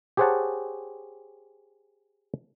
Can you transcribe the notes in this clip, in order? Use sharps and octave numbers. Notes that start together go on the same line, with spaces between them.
G4 G#4 C5 C#5 F#5 A5